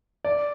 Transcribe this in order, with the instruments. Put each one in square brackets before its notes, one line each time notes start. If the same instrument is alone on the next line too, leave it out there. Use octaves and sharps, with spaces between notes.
[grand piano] D5